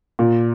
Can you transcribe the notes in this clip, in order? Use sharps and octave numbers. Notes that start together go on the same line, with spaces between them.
A#2